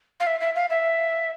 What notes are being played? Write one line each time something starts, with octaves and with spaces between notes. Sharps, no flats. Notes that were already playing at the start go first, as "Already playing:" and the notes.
F5
E5
E5
F5
E5